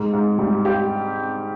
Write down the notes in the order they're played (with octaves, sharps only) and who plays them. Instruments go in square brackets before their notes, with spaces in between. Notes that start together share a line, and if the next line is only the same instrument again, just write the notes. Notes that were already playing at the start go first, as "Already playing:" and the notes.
Already playing: [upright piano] G#2
G#2
G3
G4